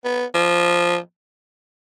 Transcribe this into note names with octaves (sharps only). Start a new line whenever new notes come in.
B3
F3